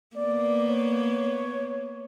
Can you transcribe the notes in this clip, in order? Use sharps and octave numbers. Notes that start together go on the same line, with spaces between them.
A#3 B3 D5
C#5